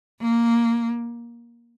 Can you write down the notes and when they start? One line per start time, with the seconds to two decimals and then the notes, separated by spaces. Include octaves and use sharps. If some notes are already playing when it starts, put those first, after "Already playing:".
0.21 A#3